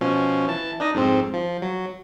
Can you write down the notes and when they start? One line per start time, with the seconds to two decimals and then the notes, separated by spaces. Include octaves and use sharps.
0.01 B2 F3 C#4
0.48 E3 A5
0.80 D4 D#4 D#5
0.95 F2 G#2 C4
1.34 F3
1.62 F#3